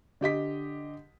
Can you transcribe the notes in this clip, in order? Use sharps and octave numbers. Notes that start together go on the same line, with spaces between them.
D3 G4 D#5 B6